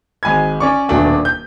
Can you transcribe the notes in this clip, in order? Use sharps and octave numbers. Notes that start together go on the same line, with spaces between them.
G#1 G#3 G#5 B5 G#6
C#4 D5 C#6
D#1 B2 A3 D4 G#5
G6